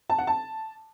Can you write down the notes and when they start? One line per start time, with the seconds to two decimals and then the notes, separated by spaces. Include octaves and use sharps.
0.10 A5
0.18 F#5
0.27 A5